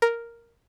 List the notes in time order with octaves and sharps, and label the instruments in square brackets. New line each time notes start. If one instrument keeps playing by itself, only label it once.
[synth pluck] A#4